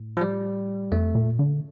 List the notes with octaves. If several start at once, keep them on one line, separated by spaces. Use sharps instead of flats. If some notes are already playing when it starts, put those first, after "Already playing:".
Already playing: A2
F3
G3
F2 A3
A#2
D3